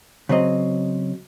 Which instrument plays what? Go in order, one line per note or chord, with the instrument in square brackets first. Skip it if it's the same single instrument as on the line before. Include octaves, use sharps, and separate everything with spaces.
[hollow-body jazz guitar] C#3 F#3 C4 D#5